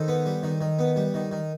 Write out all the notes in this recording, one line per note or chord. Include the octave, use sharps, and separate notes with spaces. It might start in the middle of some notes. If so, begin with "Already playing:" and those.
Already playing: D#3 A4 C5
B3
G3
D#3
D#3
B3
G3
D#3
D#3